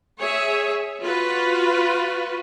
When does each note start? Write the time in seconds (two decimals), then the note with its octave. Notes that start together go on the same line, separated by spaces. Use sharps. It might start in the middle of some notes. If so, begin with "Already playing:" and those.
0.18 G#4 C#5 E5
1.04 F4 F#4 B4